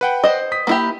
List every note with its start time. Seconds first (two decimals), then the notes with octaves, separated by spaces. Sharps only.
0.01 B4 F#5 G5
0.24 C5 D#5
0.52 D#6 B6
0.67 A#3 E4 G4